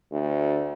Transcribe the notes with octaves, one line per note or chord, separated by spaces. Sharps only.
D2